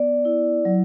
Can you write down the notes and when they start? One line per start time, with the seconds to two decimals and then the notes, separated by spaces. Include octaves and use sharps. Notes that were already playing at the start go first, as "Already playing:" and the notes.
Already playing: B3 D5
0.25 E4
0.65 F#3